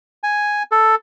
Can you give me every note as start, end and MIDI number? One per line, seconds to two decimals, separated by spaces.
0.24 0.63 80
0.72 0.95 69